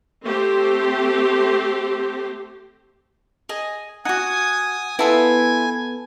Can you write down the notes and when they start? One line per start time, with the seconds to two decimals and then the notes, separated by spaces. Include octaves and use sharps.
0.24 A3 C4 G4 C5
3.49 G#4 D#5 G#5
4.05 D#4 F#4 F#5 G#5 D#6
4.99 B3 E4 F4 A4 B4 G#5